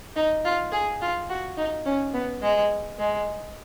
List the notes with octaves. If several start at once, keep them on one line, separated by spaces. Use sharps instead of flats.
D#4
F4
G#4
F4
F#4
D#4
C#4
B3
G#3
G#3